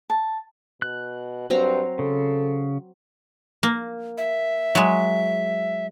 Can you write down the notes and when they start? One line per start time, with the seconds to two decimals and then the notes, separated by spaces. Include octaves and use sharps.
0.10 A5
0.82 B2 F#6
1.50 G2 F#3 C4 A#5
1.99 C#3 A4
3.63 A#3
4.18 E5
4.75 F#3 G#3